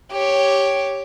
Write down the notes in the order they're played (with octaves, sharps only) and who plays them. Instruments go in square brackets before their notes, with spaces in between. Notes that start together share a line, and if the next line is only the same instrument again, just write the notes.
[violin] G4 C#5